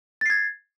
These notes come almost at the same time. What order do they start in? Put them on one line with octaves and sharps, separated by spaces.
A6 C7 G#6